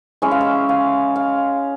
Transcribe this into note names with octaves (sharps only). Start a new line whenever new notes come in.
E3 G#3 C#4 E5
F5
E5
F5
F5